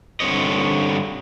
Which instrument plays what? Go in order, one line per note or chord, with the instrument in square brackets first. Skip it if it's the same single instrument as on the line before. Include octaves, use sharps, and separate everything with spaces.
[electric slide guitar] G2 D3 C4 C#5 D#5